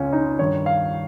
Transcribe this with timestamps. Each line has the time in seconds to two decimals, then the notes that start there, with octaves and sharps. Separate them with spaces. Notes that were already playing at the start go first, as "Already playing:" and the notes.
Already playing: C#2 C#4 F4
0.13 D#4
0.39 G2 D#3 C#5
0.66 F5